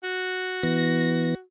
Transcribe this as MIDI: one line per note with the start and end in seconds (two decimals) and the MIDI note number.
0.03 1.41 66
0.63 1.35 52
0.63 1.35 59
0.63 1.35 94